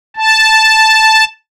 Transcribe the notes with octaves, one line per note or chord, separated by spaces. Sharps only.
A5